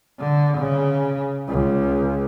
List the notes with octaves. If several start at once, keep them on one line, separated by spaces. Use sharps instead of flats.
D3
C#3
C#2